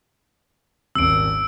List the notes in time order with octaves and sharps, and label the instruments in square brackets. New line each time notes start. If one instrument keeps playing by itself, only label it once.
[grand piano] D#1 G#1 [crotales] E6 D7